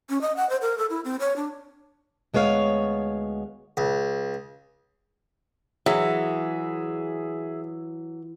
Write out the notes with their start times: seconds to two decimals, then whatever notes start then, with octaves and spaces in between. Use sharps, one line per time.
0.09 C#4
0.21 D#5
0.36 F#5
0.49 C5
0.61 A#4
0.78 A4
0.90 E4
1.05 C4
1.20 C#5
1.36 D4
2.34 D2 G#3 B3 C#5 F5
3.77 C#2
5.86 E3 F#3 G#4 E5